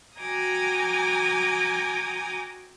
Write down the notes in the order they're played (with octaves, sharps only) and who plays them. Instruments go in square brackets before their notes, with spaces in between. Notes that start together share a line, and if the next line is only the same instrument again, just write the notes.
[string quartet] F#4 G5 G#5 A#5 D6 D#6